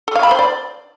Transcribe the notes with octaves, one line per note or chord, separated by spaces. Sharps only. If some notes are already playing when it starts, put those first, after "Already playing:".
A4
F5
B5
C5
D5